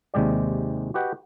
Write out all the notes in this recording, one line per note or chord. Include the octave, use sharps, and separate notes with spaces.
D#2 C3 G#3 G4 D5
F#4 G4 B4 D#5 F#5 G5